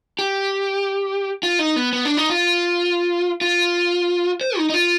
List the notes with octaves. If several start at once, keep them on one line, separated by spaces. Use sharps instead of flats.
G4
F4
D#4
B3
B3
D4
D#4
F4
F4
C5
D#4
D#4
F4